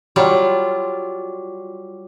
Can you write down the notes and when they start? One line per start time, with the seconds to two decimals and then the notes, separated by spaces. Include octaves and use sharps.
0.16 F#3 G3 F4